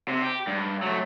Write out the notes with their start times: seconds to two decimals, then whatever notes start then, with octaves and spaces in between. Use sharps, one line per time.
0.08 C3
0.22 G4
0.47 G2
0.82 F#3 A3